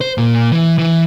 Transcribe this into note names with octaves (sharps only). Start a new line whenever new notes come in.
C5
A#2
E3
E3